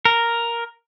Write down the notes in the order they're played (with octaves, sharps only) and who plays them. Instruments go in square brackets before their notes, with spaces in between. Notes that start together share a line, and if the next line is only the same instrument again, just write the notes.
[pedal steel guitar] A#4